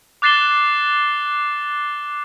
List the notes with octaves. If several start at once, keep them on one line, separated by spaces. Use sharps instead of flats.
D6 F#6 A6 C7 E7 G7